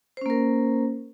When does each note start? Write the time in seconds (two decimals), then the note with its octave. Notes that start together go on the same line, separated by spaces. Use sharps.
0.17 C5
0.21 C#4
0.26 A#3
0.30 A#4